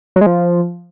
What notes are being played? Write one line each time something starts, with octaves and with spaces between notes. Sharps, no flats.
F#3
G#3
F3